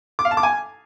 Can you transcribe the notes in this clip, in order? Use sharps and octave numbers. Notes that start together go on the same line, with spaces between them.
D6
F5
A5
D6
G#5